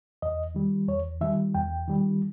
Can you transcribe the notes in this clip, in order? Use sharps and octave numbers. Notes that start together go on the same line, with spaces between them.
E2 D#5
D#3 G3
E2 C#5
D#3 G3 E5
E2 G5
D#3 G3